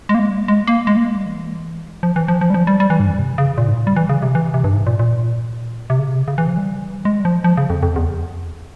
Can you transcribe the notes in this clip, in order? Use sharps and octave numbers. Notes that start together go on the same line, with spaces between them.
G#3
A#3
G#3
G3
G#3
G#3
A#3
G#3
A#3
G#3
G3
E3
F3
E3
F3
F3
G3
F3
G3
G3
E3
G2
F2
C3
C#3
A#2
G#2
G3
E3
C#3
C3
E3
C3
G2
G#2
A#2
A#2
C3
C#3
C3
C#3
E3
F3
G3
G#3
G3
F3
F3
C#3
F2
F2
E2